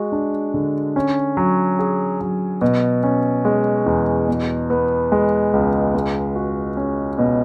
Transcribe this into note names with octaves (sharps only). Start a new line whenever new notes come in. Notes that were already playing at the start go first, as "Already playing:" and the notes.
Already playing: G#3 F#4
D4
D3
C#4
F#3
G#4
F#3
B2
C#4
G#3
E2
B2
B3
G#3
C#2
G#3
F#4
C#4
B2